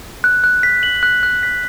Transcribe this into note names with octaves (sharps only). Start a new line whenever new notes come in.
F#6
F#6
B6
F#7
F#6
F#6
B6